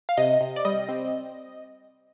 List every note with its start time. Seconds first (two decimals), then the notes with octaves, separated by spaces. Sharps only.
0.09 F5
0.17 C3 D#5
0.41 C3
0.56 D5
0.65 G3 D#5
0.89 C4